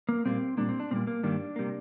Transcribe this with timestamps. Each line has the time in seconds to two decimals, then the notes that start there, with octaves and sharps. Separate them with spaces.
0.09 A#3
0.25 A#2 G3 A#3 C4
0.57 A#2 G3 A#3 D4
0.69 C4
0.80 D4
0.91 A#2 G3 A#3 C4
1.07 A#3
1.23 G2 D#3 G3 A#3 D4
1.56 C3 G3 A#3